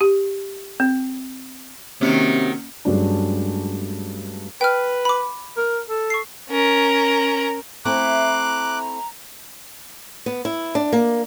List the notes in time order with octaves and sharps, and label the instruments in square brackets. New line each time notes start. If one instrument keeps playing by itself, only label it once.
[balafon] G4
C4
[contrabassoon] C3 [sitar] D#3 F#3 [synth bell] A#3 C#4 C#7
[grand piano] G2 F#3 G#3 A3 C#4 D4
[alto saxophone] B4 [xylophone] G5 F6
[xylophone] B5 D6
[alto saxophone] A#4
A4
[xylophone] C#6 C7
[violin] C#4 A#4
[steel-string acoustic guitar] A3 C4 E4 [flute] A#5 [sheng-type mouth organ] D6 F#6
[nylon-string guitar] B3
E4
D4
A#3